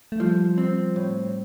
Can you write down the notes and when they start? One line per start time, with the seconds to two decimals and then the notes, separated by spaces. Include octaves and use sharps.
0.12 A3
0.20 F3 G3
0.58 C4
0.96 A2